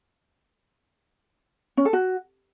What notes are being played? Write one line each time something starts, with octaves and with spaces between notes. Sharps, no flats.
C#4
A4
F#4